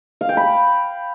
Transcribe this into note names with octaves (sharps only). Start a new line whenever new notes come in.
F5
G5
B5